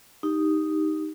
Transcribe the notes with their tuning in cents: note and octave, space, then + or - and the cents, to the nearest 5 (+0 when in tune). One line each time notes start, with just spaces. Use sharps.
D#4 +0 G4 +0